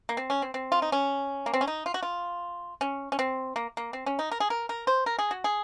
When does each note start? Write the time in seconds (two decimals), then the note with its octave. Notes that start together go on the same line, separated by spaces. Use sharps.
0.09 A#3
0.17 C4
0.30 C#4
0.42 C4
0.54 C4
0.72 F4
0.82 D#4
0.92 C#4
1.46 A#3
1.54 C4
1.61 C#4
1.67 D#4
1.86 F4
1.94 F#4
2.03 F4
2.81 C#4
3.12 C#4
3.19 C4
3.56 A#3
3.77 A#3
3.93 C4
4.06 C#4
4.19 D#4
4.31 A#4
4.40 G#4
4.50 A#4
4.69 A#4
4.87 C5
5.06 A#4
5.19 G#4
5.31 F#4
5.44 G#4